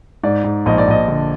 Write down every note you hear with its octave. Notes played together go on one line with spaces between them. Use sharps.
G#2 D5
G#2
A#1 D#5
D5
A#1 D#5
D3